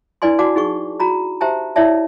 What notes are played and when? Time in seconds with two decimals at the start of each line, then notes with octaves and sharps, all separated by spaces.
0.22 D4 E4 B4 D5 G#5 C6
0.39 F#4 D5 F#5 A5 D6
0.56 D#4 G#4 F#5 C#6
1.00 F#4 A#5 B5
1.41 G4 C5 E5 G5 A5 A#5
1.76 E4 C#5 D5 E5 A5